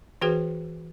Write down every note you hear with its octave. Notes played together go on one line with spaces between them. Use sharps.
E3 F#4 G#4 B4 G5